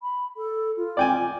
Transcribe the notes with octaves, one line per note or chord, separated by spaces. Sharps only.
B5
A4
F4
D5 G5 G#5